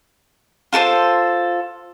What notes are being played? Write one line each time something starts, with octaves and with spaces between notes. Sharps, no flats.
F4 A4 A#4 C5